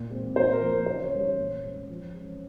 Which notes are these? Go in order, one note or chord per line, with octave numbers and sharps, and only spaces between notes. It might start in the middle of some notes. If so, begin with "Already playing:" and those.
Already playing: A#2
G#3 C4
A#2 C5
A#4
F3 A#3
A#4
C#3 C5
C#5
G3 C#4
C#5
A#2
G#3 C#4
F3
G#3 C#4